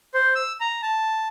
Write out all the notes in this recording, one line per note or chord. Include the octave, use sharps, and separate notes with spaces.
C5
E6
A#5
A5